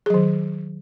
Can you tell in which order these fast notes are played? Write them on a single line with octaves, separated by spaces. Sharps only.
G#4 F#3 D#3